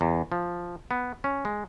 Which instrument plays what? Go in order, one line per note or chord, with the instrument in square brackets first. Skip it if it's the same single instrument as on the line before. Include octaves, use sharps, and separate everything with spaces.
[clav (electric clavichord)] E2
F3
B3
C#4
G#3